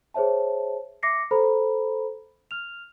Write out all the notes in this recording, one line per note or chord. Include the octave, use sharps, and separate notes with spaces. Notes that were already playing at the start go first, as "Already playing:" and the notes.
G#4 C5 C#5 E5 A5
E5 D6 A#6 C7 C#7
A4 C5 A#5 B5
F6 F7